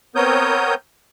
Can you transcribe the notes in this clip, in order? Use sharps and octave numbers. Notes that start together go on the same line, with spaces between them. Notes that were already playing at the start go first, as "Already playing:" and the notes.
B3 C4 A#4 C#5 D#6 G6